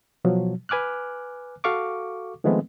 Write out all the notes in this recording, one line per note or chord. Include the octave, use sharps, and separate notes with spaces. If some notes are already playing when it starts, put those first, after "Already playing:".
B2 F3 F#3
B4 G#5 D6 F6 F#6
F#4 A4 F5 C#6 D6
D#3 F3 G#3 A3 B3 C4